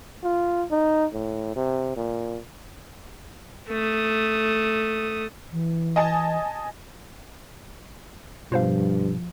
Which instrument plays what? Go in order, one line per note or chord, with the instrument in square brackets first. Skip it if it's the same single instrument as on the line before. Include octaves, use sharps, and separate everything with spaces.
[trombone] F4
D#4
A2
C3
A#2
[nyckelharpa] A3 D#6
[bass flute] E3
[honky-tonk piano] D#5 G#5 A5
[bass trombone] G2 [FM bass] B2 [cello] F3 [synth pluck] F4 C5 F5